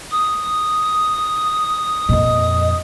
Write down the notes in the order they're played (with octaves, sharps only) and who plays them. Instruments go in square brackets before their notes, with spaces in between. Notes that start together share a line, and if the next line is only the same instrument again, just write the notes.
[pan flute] D#6
[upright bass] F2 A#2 [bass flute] D#5